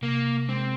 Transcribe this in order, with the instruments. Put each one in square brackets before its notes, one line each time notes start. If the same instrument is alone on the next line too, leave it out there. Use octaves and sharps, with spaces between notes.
[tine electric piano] C3 [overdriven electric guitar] A#3
[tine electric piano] G#3 [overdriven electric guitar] C4